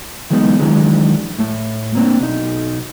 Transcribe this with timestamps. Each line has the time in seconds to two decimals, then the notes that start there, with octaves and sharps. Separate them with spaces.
0.30 E3 F#3 G#3 B3 D#4
0.59 D#3 E3 F#3 G#3 D4
1.39 A2 A3
1.95 A#3 C4 D4
2.20 B1 D#4